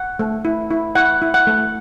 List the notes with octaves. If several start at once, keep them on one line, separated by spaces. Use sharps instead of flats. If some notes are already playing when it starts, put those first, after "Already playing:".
Already playing: F#5
A3
E4
E4
E4 F#5
E4
F#5
A3